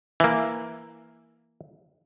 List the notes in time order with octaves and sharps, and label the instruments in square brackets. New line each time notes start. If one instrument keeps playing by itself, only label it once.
[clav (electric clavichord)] E3 A#3